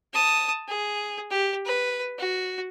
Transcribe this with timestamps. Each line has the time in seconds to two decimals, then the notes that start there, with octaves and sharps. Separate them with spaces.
0.13 A5 D#6
0.68 G#4
1.30 G4
1.66 B4
2.18 F#4